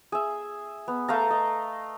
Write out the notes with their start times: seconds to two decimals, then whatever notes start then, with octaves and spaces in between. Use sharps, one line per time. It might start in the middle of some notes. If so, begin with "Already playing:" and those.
0.12 G#4 E5
0.88 B3
1.08 A3 F5 A#5
1.30 D#5